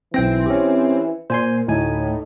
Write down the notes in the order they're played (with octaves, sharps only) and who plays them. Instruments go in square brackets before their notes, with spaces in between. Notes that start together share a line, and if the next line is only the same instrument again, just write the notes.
[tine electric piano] B1 G5 A#6 [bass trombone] E3 [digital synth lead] C4
[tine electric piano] C#4 G4
[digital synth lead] A#2 [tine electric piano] C5 G#5 C6
[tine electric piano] D2 G#5 [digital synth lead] A2 [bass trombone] D#4